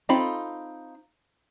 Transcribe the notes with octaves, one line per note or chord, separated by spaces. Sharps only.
C4 D#4 F4 A4 B5